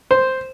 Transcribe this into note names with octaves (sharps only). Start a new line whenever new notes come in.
C5